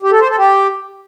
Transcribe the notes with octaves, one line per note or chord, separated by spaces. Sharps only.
G4
A4
C5
A4
G4